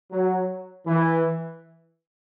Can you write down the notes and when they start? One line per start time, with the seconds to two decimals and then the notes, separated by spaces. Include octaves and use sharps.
0.11 F#3
0.86 E3